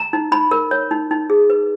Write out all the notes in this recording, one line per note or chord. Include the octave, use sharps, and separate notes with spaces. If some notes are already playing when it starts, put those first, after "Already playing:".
Already playing: A#5
D#4
D#4 B5
A#4
C#5
D#4
D#4
G#4
B4